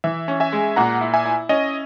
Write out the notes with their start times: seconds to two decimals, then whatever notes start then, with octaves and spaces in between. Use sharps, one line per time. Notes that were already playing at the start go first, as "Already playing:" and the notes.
0.04 E3 E5
0.28 C#4
0.40 E5 G#5
0.53 G#3
0.76 A#2 F#5 A#5
1.01 E4
1.14 E5 G#5
1.26 E4
1.49 C#4 D#5